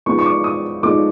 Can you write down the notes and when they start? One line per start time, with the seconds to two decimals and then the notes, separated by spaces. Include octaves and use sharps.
0.06 F3 G#3 B3 D#4 C#6
0.19 C#6
0.26 D6
0.44 D#6
0.83 F3 G#3 B3 D#4 D6